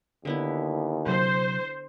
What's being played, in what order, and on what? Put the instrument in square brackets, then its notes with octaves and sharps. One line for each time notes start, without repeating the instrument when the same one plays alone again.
[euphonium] D#2 [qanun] D3 B3 E4
[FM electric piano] C3 F#3 [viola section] C5